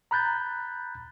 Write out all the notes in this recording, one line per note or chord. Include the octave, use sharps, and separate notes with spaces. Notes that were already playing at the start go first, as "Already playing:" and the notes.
A#5 B5 F#6 G6 A6